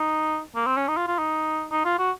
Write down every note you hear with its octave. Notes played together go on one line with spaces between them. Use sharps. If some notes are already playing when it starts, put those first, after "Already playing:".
Already playing: D#4
A#3
C4
C#4
D#4
F4
F4
D#4
D#4
F4
F#4